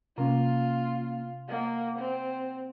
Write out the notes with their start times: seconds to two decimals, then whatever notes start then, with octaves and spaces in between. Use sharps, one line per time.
0.18 C3 A#3 C#4 F4 A#5
1.49 A#3 D#5 F5 F#5
1.99 C4